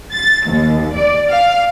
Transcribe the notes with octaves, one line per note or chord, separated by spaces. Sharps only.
A6
D#2
D5
F5